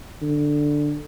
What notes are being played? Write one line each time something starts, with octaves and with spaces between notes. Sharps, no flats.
D3